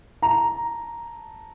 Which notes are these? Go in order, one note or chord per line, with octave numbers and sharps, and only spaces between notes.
A5 A#5